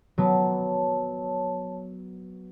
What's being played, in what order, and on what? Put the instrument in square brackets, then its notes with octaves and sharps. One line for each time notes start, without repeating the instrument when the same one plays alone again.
[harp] F#3 B3 [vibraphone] C#5 A5